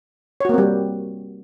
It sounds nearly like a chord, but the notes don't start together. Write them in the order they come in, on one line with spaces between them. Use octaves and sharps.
C#5 F#4 A#3 C4 G3